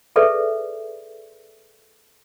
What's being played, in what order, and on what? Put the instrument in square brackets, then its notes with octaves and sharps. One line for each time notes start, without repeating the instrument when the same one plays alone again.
[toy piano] G#4 A4 B4 D5 E5